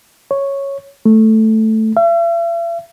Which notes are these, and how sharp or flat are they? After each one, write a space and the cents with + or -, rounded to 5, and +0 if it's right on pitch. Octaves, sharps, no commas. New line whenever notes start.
C#5 -5
A3 +0
E5 +45